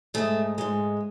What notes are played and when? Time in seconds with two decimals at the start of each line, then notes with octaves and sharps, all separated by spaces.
0.14 G#2 G#3 A3
0.58 G#2 G#3